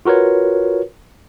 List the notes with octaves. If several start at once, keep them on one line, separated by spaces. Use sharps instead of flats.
F4 F#4 A#4 B4 C#5